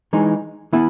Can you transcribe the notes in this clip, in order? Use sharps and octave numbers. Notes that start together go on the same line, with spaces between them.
E3 G#3 D#4
E3 B3 E4